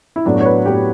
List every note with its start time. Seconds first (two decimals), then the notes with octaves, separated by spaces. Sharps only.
0.16 E4
0.25 A2 F#3 B3 D4
0.36 F#4 C#5
0.45 B4
0.66 A2 F#3 B3 G4